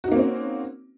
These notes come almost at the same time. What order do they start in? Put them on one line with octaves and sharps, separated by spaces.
F#4 D#4 A#3 C4 C#4